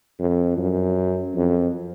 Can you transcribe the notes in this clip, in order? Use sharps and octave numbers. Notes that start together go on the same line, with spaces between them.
F2
F#2
F2